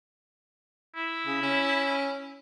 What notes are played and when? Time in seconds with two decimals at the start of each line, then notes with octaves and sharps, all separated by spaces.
0.95 E4
1.26 C#3
1.42 C#4